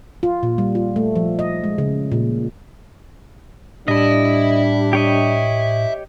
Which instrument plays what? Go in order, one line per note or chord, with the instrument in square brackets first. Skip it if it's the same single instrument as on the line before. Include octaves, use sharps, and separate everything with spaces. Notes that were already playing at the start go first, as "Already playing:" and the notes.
[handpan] F4
A#2
G3
F4
A3
F3
D#5
G#3
C#3
A#2
[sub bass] A2 [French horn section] G3 D4 [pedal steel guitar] D#5 [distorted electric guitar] E5 B5
[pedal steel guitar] G4 C#5 D#5